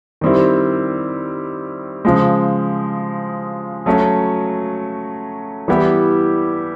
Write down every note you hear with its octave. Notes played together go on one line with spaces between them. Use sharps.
D#3 G3 C4 E4
C#3 F3 G#3
F#3 A3 C#4 F#4
E3 G3 B3 E4 G4